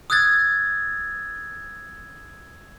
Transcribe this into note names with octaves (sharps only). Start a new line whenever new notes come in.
D#6 E6 F#6 G#6 A6